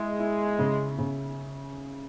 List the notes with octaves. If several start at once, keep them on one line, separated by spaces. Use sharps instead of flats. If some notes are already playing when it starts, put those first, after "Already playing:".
Already playing: G#3 E4
E4
C#3
C#3